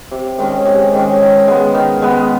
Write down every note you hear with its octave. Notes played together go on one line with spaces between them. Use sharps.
C3
D#3 G#3 C#4
C3
D#3 G#3 C#4
D#3
G#3 B3
D#3
G#3 B3